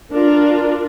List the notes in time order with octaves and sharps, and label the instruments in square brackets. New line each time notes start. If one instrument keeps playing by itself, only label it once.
[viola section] D4 F4 A#4